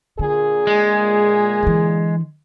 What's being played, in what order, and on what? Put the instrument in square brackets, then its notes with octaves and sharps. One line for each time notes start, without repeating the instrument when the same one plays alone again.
[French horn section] A#2 G#4 [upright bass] D3
[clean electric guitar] G#3
[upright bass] D3 E3